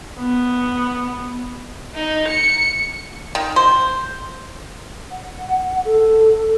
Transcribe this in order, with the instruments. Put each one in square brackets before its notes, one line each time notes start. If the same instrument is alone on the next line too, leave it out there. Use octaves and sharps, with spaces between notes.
[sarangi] B3
[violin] D#4
C#7
[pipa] D#3
C5
[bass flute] F#5
A4